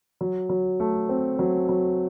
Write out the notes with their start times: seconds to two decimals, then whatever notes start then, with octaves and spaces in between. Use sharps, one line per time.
0.21 F#3
0.49 F#3
0.80 A3
1.09 C4
1.39 F#3
1.69 F#3